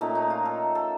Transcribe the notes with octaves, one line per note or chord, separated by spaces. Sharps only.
A#2 A3 C#4 D#4
D#4
F4
A4
A4